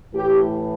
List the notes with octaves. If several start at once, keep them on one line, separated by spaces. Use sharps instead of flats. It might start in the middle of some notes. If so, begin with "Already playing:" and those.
A2 E3 A3 G4